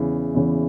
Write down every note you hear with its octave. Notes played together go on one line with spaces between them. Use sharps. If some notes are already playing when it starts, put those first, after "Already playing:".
Already playing: E2 C#3 E3
E2 C#3 E3